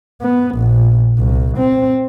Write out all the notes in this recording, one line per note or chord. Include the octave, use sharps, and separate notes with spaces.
B3
A#1
C2
C4